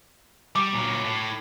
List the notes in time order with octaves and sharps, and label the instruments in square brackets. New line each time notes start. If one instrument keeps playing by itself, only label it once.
[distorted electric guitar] G3 G4 [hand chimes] D6
[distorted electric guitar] A#2 F#3
A2